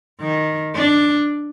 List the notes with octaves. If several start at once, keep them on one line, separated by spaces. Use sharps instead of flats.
D#3
D4